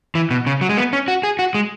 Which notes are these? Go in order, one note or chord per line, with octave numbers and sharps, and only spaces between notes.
E3
B2
C#3
F#3
G#3
B3
C#4
F#4
G#4
F#4
G#3